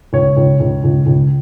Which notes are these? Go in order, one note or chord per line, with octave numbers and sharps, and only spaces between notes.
C#2 C#5
C#2
C#2
C#2
C#2